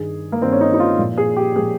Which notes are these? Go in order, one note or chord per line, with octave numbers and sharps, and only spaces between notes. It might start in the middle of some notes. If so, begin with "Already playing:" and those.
Already playing: G2 D#3 G#4
A#3
G2 D#3 C4
C#4
D#4
D#4
F4
A#2 F3
G#4
G4
A#2 F3 G#4